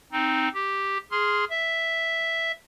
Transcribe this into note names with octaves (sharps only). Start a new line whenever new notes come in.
C4 D#4
G4
G#4 C6 F6
E5